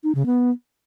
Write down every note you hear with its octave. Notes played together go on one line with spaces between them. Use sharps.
D#4
C#3
B3